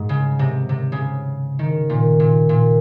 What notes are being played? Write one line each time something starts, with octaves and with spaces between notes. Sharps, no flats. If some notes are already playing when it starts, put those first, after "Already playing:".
Already playing: G#2
C#3
C3
C3
C#3
D#3
A#2
A#2
A#2